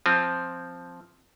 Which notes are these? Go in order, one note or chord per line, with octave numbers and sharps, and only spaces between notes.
F3 C4